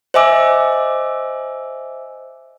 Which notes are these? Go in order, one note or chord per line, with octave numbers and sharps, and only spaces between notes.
C5 D#5 E5 G#5 D6 E6